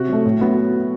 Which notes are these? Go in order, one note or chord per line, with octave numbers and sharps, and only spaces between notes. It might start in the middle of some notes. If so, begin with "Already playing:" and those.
Already playing: C3 F#4
F#3 A3
A2
F#3 B3